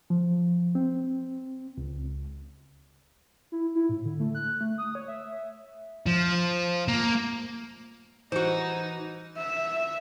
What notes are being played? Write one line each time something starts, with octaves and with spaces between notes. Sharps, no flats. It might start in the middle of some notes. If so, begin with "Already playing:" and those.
F3
C4
C#2
E4
E4
A2
D3
A3
F#6
A3
D#6
C#5
E5
F3
A#3
E3 D#4 F#4 C5
E5